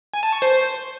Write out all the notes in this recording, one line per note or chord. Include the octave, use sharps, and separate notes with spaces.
G#5
A5
C#6
C5